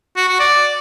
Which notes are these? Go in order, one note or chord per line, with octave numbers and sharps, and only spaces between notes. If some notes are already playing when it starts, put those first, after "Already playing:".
F#4
F#4
D5